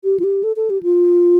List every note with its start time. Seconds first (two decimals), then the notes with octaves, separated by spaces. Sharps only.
0.04 G4
0.20 F4
0.24 G4
0.43 A4
0.56 A4
0.70 G4
0.83 F4